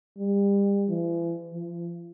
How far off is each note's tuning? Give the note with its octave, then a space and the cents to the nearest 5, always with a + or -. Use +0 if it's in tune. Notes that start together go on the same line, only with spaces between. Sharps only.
G3 +35
E3 +40
F3 -35